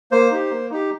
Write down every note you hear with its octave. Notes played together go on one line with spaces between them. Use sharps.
A#3 C5
D#4 G4
A#3
D#4 G4